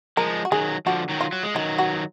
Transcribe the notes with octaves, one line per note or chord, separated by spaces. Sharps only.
F3 G#3 A#4
F#4
D#3 F#3 G#4
D3 F3 F#4
D#3 F#3
F4
F#3
G#3
D#3 F#3 D#4
F#4